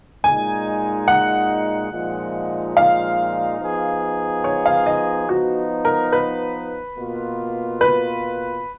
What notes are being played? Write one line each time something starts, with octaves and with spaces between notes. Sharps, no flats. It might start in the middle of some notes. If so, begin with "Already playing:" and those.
A#2 G#3 D#4 G#5
F#5
A#2 F3 G#3 D#4
F5
F3 B3 D#4 G#4
C#5
F5
D#5
F3 B3 D#4 F#4
A#4
B4
B2 A#3 F4
B4